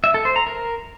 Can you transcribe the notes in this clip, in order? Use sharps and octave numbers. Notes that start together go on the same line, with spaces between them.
E5
A4
C5
A#5
A#4